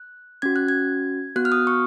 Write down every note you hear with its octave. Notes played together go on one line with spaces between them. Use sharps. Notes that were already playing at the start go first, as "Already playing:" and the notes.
Already playing: F#6
C#4 F#4 G#6
F#6
G#6
B3 F#4 F#6
F6
D#6
C#6